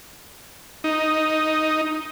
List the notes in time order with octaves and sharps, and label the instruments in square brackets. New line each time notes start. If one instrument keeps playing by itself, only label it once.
[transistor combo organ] D#4